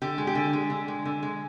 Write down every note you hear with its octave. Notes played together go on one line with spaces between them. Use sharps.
D3 G4
G#3
G4
D3
G#3
D3
G#3
D3
G#3